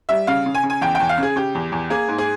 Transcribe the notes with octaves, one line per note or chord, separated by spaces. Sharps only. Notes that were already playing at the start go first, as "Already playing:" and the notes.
G3 E5
C#3 F5
C#3
G#5
C#3
G#5
E2 G5
E2 G5
F5
C#3
G#4
C#3 G4
E2
E2
A#3 G#4
G#2
G#4